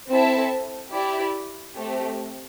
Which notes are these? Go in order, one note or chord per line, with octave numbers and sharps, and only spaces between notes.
C4 E4 A4 E5 A5
E4 G4 D5
A3 C4 G4